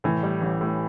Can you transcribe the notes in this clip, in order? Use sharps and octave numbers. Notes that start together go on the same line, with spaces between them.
A2 E3
G3
A1
A2